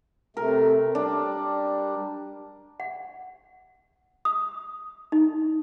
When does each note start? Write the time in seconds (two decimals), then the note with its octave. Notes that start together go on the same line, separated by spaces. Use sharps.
0.37 C3 A3 A#4
0.95 G3 D4
2.80 F#5
4.25 D#6
5.12 D#4